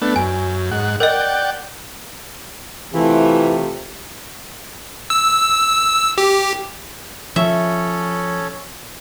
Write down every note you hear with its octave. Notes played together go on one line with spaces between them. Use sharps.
A3 B3 D4
F#2 G#5
G#2 F#5
A#4 D5 D#5 F#5 G5
C3 E3 A3 F4
E6
G4
F3 C#4 A4 C#5 E5